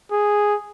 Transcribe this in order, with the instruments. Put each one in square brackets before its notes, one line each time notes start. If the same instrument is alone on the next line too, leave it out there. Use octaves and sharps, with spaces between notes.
[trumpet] G#4